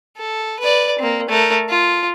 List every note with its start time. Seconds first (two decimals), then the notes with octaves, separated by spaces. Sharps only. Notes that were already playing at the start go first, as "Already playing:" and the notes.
0.17 A4
0.59 B4 D5
0.99 A#3 C4
1.29 A3 A#4
1.69 F4